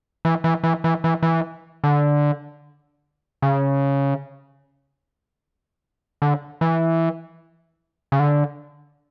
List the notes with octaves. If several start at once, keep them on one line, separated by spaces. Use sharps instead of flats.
E3
E3
E3
E3
E3
E3
D3
C#3
D3
E3
C#3
D3